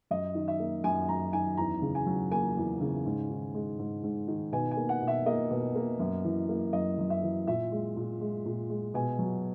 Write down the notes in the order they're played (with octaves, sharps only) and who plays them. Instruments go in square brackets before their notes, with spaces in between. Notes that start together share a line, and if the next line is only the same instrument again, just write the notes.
[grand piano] F#2 D#5
D#3
E5
A#3
F#2 G#5
F#2 A#5
D#3 G#5
E2 A#5
C#3
G#5
F#3
A#3 G#5
E2
C#3
G#2
D#3
G#3
G#2
G#2
D#3
B2 G#5
G#5
A#3
F#5
B2
E5
A#3 D#5
B2
A#3
F#2
E3
A#3
F#2 D#5
F#2
E5
E3
A#2 E5
G#3
A#2
G#3
A#2
G#3
B2 G#5
F#3